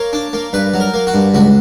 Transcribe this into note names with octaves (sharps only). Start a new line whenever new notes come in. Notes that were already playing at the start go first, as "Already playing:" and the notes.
Already playing: A#3 C#5
D4
A#3
G2 B4
F#3
A#4
A#3
F#4
G2
C#2 F#4